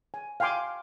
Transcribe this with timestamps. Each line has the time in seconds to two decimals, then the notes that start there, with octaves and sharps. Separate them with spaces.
0.14 G#5
0.40 F5 G5 G#5 C6 D6